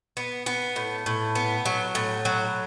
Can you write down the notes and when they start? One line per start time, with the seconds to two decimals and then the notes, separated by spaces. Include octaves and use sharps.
0.17 B3
0.46 B3
0.76 A2
1.06 A2
1.35 B3
1.66 F#3
1.95 A2
2.25 F#3